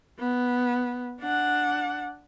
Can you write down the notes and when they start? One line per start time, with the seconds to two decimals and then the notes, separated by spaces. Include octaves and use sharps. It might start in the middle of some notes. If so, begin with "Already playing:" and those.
0.19 B3
1.21 D4 F#5